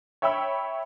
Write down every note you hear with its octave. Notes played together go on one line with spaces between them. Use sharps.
C#5 E5 G5 B5 E6